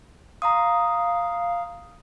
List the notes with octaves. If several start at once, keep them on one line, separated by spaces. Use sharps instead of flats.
F5 A#5 C6 D#6